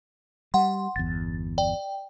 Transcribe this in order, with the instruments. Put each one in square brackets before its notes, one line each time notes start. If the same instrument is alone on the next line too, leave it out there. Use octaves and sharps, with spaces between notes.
[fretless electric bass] G3 [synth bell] F#5 C6
[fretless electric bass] G1 E2 [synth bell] A6
[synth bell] D5 G5